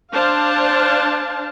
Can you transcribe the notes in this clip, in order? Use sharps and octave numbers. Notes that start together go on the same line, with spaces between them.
D4 C5 F5 A5